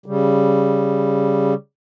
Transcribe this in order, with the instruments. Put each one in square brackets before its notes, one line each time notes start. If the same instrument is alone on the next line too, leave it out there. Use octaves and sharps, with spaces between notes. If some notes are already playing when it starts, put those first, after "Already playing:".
[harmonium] C#3 G3